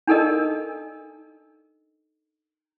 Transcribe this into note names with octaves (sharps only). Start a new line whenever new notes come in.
D4 D#4 A4 A#4 D#5